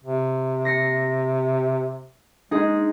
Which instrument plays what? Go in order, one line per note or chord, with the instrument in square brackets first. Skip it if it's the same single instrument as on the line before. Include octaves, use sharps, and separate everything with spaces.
[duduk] C3
[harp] A#6 C7 C#7
[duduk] G#3 [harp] D#4 G#4